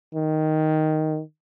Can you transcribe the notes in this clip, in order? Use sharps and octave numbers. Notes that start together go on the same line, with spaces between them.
D#3